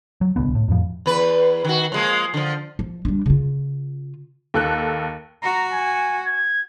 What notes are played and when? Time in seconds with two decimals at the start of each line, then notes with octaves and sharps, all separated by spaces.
0.21 F#3
0.36 D1 C2 D3 B3
0.55 A2
0.68 F2 A2 F3
1.06 E2 B4
1.65 D#3 F#4
1.92 F3 G#3 A#3
2.34 D3 F3
2.79 F3
3.05 G3 D4
3.26 C#3 F4
4.54 D#2 A4 F#6
5.43 F#4 A#5
5.72 G#5
6.26 G#6